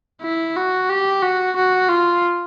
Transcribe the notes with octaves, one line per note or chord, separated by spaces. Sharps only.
E4
F#4
G4
F#4
F#4
F4